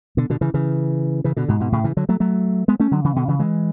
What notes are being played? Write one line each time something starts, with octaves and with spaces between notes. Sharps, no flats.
B2 D3
B2 D3
C#3 E3
C#3 E3
C#3 E3
B2 D3
G#2 B2
G#2 B2
A2 C#3
C#3 E3
D3 F#3
F#3 A3
F#3 A3
G#3 B3
A3 C#4
D3 F#3
C#3 E3
B2 D3
C#3 E3
E3 G#3